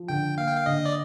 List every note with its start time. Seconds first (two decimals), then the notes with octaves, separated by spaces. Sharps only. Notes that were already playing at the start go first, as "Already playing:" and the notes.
Already playing: F3
0.08 D3 G5
0.38 A#3 F5
0.47 G5
0.57 F5
0.66 D3 D#5
0.85 D5